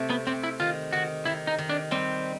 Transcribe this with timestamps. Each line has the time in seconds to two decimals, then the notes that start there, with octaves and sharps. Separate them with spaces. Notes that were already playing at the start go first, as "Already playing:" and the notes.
Already playing: C3 A3
0.10 B3
0.27 C3 C4
0.44 E4
0.60 D#3 F4
0.93 D#3 F#4
1.25 D#3 E4
1.47 D#4
1.58 D#3
1.69 D4
1.91 G3 C4